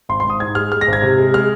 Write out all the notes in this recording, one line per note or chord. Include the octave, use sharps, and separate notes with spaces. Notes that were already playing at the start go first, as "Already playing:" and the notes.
G#1 C6
C6
G#1
D#6
G#2 G#6
G#3 F6
G#3 F6
A#6
G#1
G#6
C3
G#3
G#3 F6